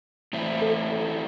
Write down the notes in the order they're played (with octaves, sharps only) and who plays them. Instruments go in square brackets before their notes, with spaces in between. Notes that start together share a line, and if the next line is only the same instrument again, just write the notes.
[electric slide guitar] A2 E3 C4 E4
[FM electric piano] A4